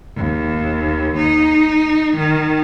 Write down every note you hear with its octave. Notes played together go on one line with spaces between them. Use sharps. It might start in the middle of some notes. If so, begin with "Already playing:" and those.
D#2
D#4
D#3